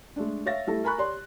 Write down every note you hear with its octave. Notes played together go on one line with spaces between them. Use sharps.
G#3 A3 D4
C#5 E5 F5 A6 A#6
G3 A3 E4 A4
A#4 G#5 A#5 B5 C#6 F#6
G4 C#5 D5 C6